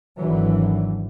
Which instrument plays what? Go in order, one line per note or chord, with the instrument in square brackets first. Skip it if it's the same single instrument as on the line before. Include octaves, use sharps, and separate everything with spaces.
[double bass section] G#1 D3 E3 F#3